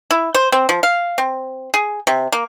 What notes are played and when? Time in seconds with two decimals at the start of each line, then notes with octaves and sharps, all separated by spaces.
0.11 E4
0.34 C5
0.52 C4
0.69 F3
0.83 F5
1.18 C4
1.74 G#4
2.07 C3
2.32 A#3